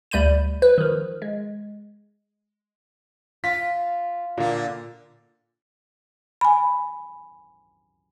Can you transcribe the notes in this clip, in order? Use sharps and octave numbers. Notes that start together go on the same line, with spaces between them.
D2 G3 B5 G6 D#7
B4
D#3 F3
G#3
F4 B6
A#2 D3 A#3
G#5 B5